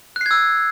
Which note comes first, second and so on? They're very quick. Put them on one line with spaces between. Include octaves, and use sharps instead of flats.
F#6 C7 G#6 E6